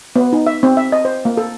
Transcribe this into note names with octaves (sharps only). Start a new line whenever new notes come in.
B3
D#4
E5
C4
E5
D#5
C5
A#3
A4